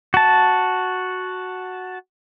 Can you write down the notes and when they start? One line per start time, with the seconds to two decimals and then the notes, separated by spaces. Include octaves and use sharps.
0.14 F#4 A5